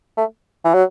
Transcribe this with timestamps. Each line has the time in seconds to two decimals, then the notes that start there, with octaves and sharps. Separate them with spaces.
0.17 A3
0.65 E3
0.74 F#3